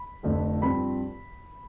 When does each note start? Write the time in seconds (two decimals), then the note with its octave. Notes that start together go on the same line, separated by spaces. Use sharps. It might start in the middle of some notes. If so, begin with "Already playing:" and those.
Already playing: B5
0.23 F1 F2 D3 F3 A3
0.62 G2 F3 C4 B5